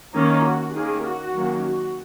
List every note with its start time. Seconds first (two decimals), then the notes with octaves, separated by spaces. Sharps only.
0.13 D#3 A#3 C#4 D#4
0.44 F#4
0.74 D#3 A#3 C#4 G#4
1.04 F#4
1.34 D#3 F#3 A#3 C#4
1.64 F#4